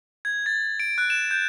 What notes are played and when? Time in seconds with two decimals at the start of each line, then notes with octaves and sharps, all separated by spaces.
0.25 G#6
0.46 A6
0.80 D7
0.98 F#6
1.10 E7
1.31 G6